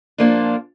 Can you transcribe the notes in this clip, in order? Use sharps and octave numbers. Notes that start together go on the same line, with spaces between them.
A#2 F3 A#3 D4